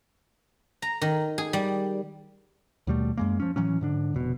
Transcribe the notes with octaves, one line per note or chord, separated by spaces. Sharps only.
A#5
D#3
G#4
G3
D#2 B2 G3 A3
F#2 G#3 A#3
F3 C#4
A2 E3 F#3 C#4
G#2 D3 D4
F1 B2